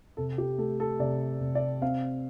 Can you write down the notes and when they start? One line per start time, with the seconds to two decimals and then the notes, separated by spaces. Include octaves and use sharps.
0.17 C3 A4
0.38 G4
0.58 A3 A4
0.80 A4
0.99 C3 D5
1.41 C3
1.55 D5
1.82 C4 F5